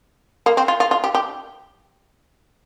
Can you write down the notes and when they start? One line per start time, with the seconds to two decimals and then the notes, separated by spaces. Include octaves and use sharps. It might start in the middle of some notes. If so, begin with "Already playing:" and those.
0.46 A#3
0.57 C4
0.68 F4
0.80 F4
0.91 F4
1.04 G4
1.15 G4